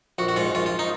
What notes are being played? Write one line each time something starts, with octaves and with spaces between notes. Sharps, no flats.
A#1 F#4
F#4
G#2 F4
A#1 F4
F4
D#4